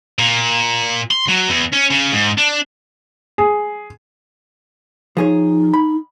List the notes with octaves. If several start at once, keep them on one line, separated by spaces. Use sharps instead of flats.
A#2
C6
F#3
E2
C#4
C#3
G#2
D4
G#4
F3 D#4 G#4 C#5
B5